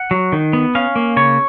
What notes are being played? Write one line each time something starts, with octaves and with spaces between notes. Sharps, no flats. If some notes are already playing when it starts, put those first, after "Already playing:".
Already playing: F#5
F#3
D#3
B3
C#4 F5
A#3
C#3 C#5